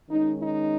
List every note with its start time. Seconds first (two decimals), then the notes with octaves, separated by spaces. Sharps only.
0.10 D#3 G#3 C#4 D#4
0.42 D#4